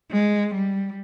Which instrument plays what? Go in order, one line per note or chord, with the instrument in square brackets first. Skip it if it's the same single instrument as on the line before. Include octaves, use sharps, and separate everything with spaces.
[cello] G#3
G3